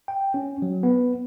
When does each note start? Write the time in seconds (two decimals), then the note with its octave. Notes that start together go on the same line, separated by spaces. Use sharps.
0.08 G5
0.34 C#4
0.62 F#3
0.83 B3